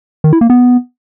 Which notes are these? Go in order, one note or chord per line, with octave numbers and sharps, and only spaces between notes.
D#3
E4
A#3
B3